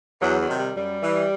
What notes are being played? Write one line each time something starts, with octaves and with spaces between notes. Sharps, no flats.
E2 F#3
F#3
C3 D#3
G3
F#2 G3
E3